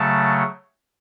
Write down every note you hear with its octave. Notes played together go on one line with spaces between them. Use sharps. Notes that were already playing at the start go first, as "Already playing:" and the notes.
Already playing: C#3 F#3 A3 A5